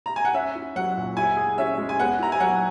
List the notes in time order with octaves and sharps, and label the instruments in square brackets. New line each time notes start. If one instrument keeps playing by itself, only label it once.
[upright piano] A#5
G#5
F#5
[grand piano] C#4 [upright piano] E5
[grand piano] E4
[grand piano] F#3 [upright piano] F#5
[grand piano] A#2
[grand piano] E4 [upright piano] G#5
[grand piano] G#4
[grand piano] C#4 [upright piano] E5
[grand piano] G#3
[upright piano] G#5
[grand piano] B3 [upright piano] F#5
[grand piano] E4 [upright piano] A#5
[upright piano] G#5
[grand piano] F#3 [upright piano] F#5